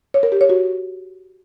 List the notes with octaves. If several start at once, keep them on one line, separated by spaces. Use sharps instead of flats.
C#5
A#4
G4
C#5
F#4